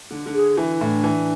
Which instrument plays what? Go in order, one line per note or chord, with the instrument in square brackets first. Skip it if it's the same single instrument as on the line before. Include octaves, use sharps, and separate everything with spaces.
[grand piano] D3
D3
[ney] G#4
[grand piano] E3 [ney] E4
[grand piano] A2 [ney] D4
[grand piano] E3